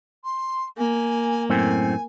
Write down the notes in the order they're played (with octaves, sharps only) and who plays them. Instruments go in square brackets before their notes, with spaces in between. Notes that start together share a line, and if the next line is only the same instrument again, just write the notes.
[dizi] C6
[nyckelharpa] A#3 [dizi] G#5
[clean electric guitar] F#2 A2 C4 [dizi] G#5